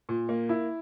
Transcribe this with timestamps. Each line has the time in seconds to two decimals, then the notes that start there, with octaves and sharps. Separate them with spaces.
0.09 A#2
0.29 A#3
0.49 E4